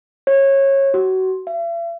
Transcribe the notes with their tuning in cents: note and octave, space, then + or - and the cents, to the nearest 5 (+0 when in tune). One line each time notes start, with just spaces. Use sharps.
C#5 -20
F#4 +25
E5 +45